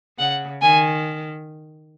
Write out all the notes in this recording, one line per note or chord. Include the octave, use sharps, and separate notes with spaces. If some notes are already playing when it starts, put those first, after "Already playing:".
C#3 F#5
D#3 G#5